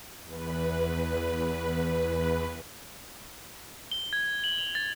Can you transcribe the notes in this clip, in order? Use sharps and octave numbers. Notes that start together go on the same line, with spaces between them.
E2 B4
G7
G#6
F#7
F7
A6